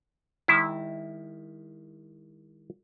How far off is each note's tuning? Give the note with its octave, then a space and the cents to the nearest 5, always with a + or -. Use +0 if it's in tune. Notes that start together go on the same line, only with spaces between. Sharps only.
D#3 +0 G#3 -45 E4 -5